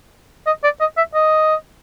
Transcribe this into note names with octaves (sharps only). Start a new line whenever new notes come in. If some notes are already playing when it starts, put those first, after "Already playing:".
D#5
D5
D#5
E5
D#5